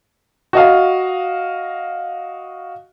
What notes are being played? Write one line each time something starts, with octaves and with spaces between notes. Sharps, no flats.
F#4 D#5 F5